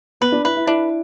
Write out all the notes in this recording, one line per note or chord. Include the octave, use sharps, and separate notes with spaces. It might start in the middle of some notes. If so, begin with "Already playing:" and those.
B3 B4
D4
E4 B4
E4
D4 E4